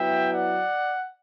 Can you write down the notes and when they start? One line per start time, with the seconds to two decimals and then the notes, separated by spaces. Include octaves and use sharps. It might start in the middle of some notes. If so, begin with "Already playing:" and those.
Already playing: F#3 B3 E4 E5 G5
0.32 D5 F#5